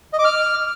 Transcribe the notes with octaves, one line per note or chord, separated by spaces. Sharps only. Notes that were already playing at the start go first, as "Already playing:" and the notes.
D#5
D6
F6